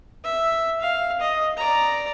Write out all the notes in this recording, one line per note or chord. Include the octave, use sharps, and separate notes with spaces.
E5
F5
D#5
D5 A#5